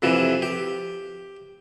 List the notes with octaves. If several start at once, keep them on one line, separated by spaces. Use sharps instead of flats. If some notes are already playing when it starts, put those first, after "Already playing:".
F2 C3 E3
G4